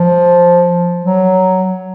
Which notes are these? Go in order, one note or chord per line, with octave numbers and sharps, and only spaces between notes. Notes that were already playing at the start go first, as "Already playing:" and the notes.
Already playing: F3
F#3